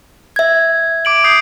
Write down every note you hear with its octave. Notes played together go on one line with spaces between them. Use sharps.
E5 G#6
D6 D7 F#7
D#6 G6 C7